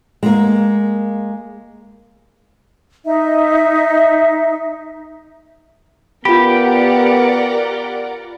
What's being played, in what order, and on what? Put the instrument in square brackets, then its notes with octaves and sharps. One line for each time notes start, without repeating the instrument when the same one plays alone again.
[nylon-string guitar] G#3 A#3
[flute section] D#4 E5
[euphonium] B3 [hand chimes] F4 B5 [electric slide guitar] G4 [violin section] A#4 D5 F#5